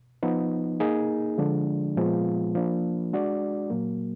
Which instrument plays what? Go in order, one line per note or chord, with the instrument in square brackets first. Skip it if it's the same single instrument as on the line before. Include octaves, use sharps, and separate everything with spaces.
[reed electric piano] F3 B3 D#4
A#3 D#4 G#4
D3 F3 G#3 D4
A#2 F3 G#3 B3 F4
F3 A#3 D4
G#3 D4 F#4 D5
A#2 F#3 A#3